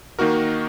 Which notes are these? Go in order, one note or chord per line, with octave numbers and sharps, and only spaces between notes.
D#3 A#3 D#4 F#4 A#4